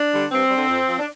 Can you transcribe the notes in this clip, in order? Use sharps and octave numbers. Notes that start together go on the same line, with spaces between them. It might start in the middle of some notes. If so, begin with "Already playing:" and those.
Already playing: D4
D3 G3
G2 C4
G3
D3
F2
F3
D4